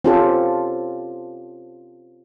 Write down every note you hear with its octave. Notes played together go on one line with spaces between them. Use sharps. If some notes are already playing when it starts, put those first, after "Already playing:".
C4 C#4 F4 G4 A4